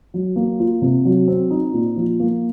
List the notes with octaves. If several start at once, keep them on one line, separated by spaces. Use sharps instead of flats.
F#3
A#3
F4
C3
F#3
C4
D#4
A#2
F3
A#3